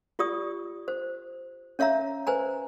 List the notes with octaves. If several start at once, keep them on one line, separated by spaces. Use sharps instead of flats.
F4 G4 D5 D#6
C5
C#4 C#5 E5 F5 A#5
B4 C5 G#5 A#5